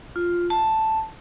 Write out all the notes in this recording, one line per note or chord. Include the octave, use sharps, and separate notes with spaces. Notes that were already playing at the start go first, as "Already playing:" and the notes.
F4
A5